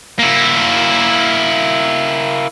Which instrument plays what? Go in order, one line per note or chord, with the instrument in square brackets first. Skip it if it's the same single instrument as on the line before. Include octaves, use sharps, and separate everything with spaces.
[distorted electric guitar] A#3 E4